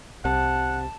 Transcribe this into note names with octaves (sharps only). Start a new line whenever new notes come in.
C2 C3 F#5 A5